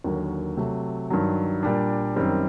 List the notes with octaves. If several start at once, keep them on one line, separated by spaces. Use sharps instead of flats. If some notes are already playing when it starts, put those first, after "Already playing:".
D#2 D3 F#3 A#3
C3 F#3 A3
G2 D#3 F#3
A#2 G3 D4
F#2 D#3 G3 C4